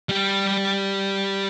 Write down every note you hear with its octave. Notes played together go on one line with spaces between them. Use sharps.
G3 G4